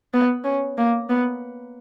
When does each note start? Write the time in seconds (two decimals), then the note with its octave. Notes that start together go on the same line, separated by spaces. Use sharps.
0.14 B3
0.45 C#4
0.78 A#3
1.10 B3